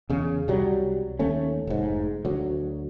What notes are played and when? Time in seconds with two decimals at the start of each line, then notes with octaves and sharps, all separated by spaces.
0.10 E2 C#3
0.48 C2 F#3 G3
1.19 D#2 A3 C#4
1.67 F1 G#2
2.25 D2 F#3